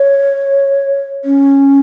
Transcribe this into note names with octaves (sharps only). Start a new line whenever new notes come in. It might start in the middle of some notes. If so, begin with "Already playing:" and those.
Already playing: C#5
C#4